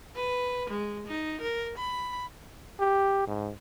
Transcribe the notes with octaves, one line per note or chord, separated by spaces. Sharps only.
B4
G#3
D#4
A#4
B5
G4
G#2